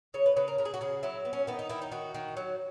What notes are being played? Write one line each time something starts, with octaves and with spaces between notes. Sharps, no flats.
C#3 C#5
B4
C#3 B4
A#4
C#3 A#4
G#4
F#4
C#3 G#4
F#3 E4
B3
C#4
D#3 B3
D#4
D#3 E4
D#4
D#3 F#4
D#3
F#3